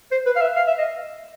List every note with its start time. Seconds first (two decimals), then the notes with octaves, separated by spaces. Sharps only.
0.11 C5
0.26 B4
0.36 F5
0.41 E5
0.56 F5
0.67 E5
0.78 D#5